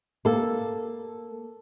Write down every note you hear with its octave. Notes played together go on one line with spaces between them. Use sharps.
A#3 A4